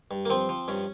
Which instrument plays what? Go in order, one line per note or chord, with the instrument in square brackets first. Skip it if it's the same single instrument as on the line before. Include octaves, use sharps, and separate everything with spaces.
[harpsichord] G2
A#3
F3 C4
F3
G2 C#4